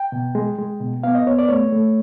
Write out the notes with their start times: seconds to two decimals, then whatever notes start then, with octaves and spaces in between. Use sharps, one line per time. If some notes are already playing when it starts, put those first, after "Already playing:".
Already playing: G5
0.12 B2
0.35 G#3
0.58 G#3
0.81 B2
1.03 B3 F5
1.15 D#5
1.27 B3 C#5
1.39 D5
1.49 A3 C#5
1.72 A3